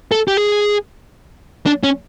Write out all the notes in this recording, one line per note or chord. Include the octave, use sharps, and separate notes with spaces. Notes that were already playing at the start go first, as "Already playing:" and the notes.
A4
G4
G#4
D4
C#4